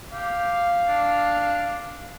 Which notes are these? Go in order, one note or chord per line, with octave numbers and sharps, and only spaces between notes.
G4 F5
D4